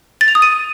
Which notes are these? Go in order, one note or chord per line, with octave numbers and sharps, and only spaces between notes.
A6
F7
D#6
D#7